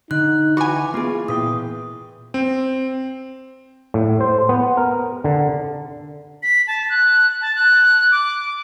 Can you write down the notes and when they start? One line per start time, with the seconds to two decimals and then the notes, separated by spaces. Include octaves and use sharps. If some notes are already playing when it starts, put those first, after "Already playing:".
0.11 D3 D#4 F#6
0.57 E3 F#4 G#5 B5 D6
0.94 A#3 B3 F4 G#4
1.28 A#2 E3 B4 G5 D#6
2.34 C4
3.94 A2
4.21 C5
4.49 B3
4.77 A#4
5.24 D3
6.43 B6
6.67 A5
6.89 F#6
7.41 A5
7.55 F#6
8.11 D6